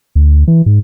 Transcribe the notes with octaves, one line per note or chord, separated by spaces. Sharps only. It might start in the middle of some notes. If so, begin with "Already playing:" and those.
D2
E3
G#2